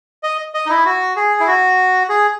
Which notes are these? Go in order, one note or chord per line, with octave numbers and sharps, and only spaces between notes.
D#5
D#5
D#4
E4
F#4
G#4
E4
F#4
G#4